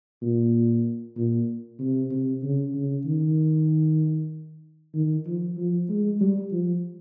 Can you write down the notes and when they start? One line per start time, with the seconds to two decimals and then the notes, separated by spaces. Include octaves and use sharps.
0.22 A#2
1.17 A#2
1.80 C3
2.11 C3
2.43 C#3
2.75 C#3
3.06 D#3
4.95 D#3
5.26 F3
5.57 F3
5.89 G#3
6.21 G3
6.52 F3